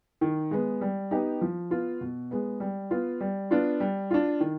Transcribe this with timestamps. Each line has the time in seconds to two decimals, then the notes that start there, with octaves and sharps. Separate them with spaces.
0.21 D#3
0.51 G#3 B3
0.81 G3
1.11 B3 D#4 G4
1.41 F3
1.70 B3 F4
2.01 B2
2.31 G#3 B3
2.60 G3
2.91 B3 F4
3.21 G3
3.51 B3 D4 F4
3.80 G3
4.11 D4 F4
4.40 D#3